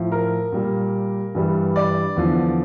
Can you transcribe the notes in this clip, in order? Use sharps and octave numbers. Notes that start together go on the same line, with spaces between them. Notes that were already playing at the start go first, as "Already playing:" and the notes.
Already playing: A2 F3
A#4
A#2 G3
G2 E3 G3
D5
E2 D3 F3